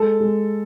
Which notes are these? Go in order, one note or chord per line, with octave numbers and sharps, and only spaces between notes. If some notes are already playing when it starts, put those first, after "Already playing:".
Already playing: G#3 A4
G#3